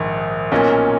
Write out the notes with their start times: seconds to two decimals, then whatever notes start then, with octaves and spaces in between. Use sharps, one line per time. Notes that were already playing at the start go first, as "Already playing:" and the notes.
Already playing: A#1 G#2 D#3
0.52 B1 A#2 A#3 C#4